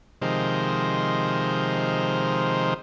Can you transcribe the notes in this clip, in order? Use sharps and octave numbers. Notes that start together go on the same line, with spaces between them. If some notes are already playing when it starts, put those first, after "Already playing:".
C3 D#3 F3 G#3 A#4 C5